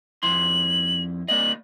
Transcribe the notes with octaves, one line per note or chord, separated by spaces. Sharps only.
F2 E4 C6 F#7
A#3 D5 D#5 F#7